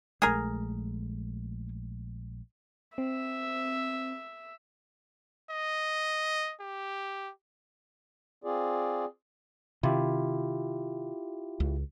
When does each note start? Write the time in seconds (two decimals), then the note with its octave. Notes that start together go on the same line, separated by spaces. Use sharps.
0.22 A#1 G#3 A3 G#4 A#4
2.98 C4 E5
5.50 D#5
6.60 G4
8.44 C4 F4 G#4 D5
9.83 C3 D#3 E4 F4 G4
11.60 C#2